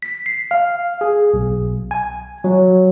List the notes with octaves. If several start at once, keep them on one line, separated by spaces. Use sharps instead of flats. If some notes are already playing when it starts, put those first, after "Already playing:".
B6
C7
F5
G#4
B1
G#5
F#3